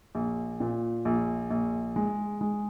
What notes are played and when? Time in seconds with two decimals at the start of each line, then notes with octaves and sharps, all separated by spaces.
0.15 A#1
0.60 A#2
1.05 A#1
1.51 A#1
1.96 G#3
2.41 G#3